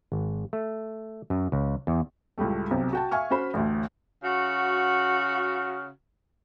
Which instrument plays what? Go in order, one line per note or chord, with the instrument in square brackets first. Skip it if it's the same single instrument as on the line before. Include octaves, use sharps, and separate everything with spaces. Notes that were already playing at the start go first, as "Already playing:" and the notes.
[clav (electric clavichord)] G#1
A3
F#2
C#2
E2
[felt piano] C#2 A2 G3 A3
B1 C3
F#4 G5 A5
E5 F5 G#5 C#6 F6
C#4 F#4 C5 B5
A1 D2
[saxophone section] C#3 F#4